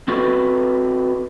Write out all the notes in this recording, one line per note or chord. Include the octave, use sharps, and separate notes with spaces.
C4 F#4 A4 B4